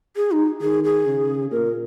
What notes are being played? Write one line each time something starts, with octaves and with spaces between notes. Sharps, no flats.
G#4
D#4
D#3 G#4
G#4
C#3
A#2 A#4